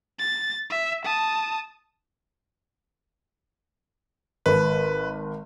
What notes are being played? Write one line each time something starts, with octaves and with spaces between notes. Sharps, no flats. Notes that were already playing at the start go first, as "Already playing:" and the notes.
A6
E5
A5 D#6
G#1 A4 B4